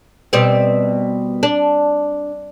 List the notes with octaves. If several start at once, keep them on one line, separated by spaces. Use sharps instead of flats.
B2 G3 C4
D4